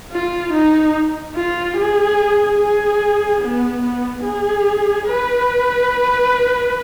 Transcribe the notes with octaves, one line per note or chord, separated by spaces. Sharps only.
F4
D#4
F4
G#4
G#4
B3
B3
G#4
B4